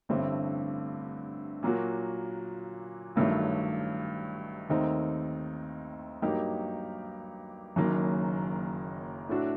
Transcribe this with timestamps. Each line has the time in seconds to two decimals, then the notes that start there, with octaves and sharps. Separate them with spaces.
0.09 A1 G2 D3 A3 C4
1.63 A#2 F#3 A#3 F#4
3.16 A1 G2 D#3 F#3 A3
4.69 D#2 D#3 A3 C4 D#4
6.22 G2 F#3 A#3 D#4 G4
7.76 F#1 F#2 D#3 F#3 A#3
9.29 A2 A3 D4 F#4